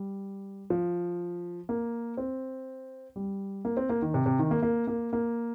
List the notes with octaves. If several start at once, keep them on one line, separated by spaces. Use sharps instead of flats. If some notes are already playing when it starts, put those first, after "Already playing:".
Already playing: G3
F3
A#3
C4
G3
A#3
C4
A#3
D#3
C3
C3
D#3
A#3
A#3
A#3
A#3